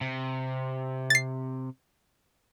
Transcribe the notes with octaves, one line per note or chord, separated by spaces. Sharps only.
C3
A6 C7